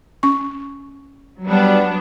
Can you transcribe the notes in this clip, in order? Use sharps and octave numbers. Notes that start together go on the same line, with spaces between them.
C#4 C#6
F#3 G3 B3 D4